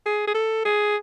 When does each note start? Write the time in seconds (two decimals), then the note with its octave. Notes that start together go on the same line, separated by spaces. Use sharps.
0.06 G#4
0.28 G#4
0.34 A4
0.65 G#4